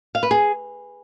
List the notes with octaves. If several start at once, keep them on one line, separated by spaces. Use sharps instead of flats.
F5
B4
G#4